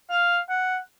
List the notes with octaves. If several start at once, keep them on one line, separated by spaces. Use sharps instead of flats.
F5
F#5